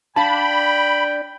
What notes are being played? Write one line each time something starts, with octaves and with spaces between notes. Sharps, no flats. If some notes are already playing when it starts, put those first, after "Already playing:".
D4 F5 G5 A5 B5